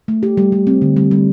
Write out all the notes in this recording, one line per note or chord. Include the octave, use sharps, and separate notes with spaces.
A3
G4
G3
G3
C4
D3
G3
G3